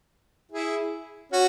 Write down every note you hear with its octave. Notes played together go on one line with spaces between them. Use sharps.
E4 G#4
C#4 F#4